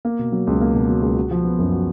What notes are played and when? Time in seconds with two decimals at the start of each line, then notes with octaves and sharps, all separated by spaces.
0.05 A#3
0.19 B2
0.32 F#3
0.47 C#2
0.61 A#3
0.74 B2
0.89 F#3
1.02 C#2
1.16 F#4
1.31 F3
1.44 B3
1.59 F#2
1.72 F#4